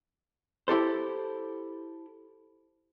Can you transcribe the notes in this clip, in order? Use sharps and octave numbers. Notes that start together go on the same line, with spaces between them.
E4 G4 A4 C5